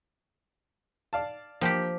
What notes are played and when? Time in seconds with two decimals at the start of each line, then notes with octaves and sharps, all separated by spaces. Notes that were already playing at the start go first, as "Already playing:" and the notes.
1.13 D5 F5 A5
1.61 F3 A#3 G4 G5